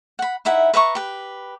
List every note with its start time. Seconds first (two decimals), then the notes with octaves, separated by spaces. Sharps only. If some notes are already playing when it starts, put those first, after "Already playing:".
0.19 F#5 B5
0.45 D#4 E4 E5 F#5
0.74 B4 E5 A#5 C#6
0.95 G4 B4